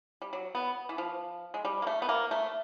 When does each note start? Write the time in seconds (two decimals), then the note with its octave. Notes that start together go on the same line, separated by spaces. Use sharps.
0.22 G3
0.33 F#3
0.55 B3
0.89 E3
0.98 F3
1.54 G#3
1.65 G3
1.82 A#3
1.87 A3
2.02 B3
2.09 A#3
2.31 A3